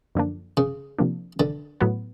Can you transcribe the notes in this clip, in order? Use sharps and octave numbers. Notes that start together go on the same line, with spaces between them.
F#2 D3 F3 A#3 D4
C#3
C3 F3 A#3 D4
D3
A2 F#3 B3